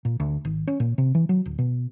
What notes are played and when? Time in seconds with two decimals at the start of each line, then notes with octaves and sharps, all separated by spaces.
0.05 A#2
0.20 D2
0.45 G#1
0.67 C#4
0.80 A#2
0.98 C3
1.15 E3
1.29 F#3
1.46 D1
1.58 B2